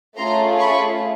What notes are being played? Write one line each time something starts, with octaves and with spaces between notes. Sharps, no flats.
A3 C#4 F4 G#4 A#5 C6
B5 C#6